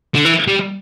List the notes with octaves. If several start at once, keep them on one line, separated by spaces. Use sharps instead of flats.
D3
E3
G3